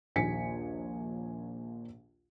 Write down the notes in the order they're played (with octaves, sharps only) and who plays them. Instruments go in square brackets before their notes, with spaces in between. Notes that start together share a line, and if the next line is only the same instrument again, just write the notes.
[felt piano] A#1 D#2 G#5 B6 C#7